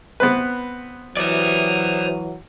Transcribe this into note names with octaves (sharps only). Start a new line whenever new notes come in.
B3 C4 B4
E3 F#3 C5 D5 D#6 F6